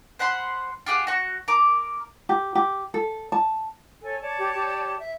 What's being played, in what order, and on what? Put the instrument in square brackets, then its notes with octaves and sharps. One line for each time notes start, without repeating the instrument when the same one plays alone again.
[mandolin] C5 F#5 B5 C6
F4 G4 G#4 F#5
F#4 C#6
A#4 D6
[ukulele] G4
G4
A4
A5
[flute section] A4 C#5 G#5
C#5 D5 A5
[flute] G4
G4
E5